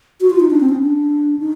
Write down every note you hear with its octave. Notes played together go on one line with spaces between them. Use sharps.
F#4
F4
D#4
D4
C4
C#4
D4
D#4